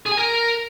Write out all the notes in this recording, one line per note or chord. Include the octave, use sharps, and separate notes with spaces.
G#4
G#5
A#4